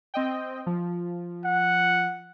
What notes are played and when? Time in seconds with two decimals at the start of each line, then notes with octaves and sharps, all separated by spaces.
0.14 C4 D#5 G5
0.67 F3
1.45 F#5